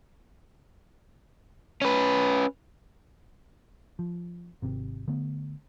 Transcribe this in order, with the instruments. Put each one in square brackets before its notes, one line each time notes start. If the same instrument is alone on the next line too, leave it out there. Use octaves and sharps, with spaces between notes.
[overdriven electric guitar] C#4 B4
[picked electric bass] F3
G#1 C3
D3 A3 B3